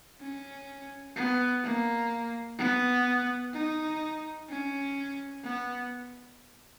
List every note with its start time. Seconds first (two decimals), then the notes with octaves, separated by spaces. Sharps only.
0.21 C#4
1.17 B3
1.64 A#3
2.59 B3
3.54 D#4
4.49 C#4
5.44 B3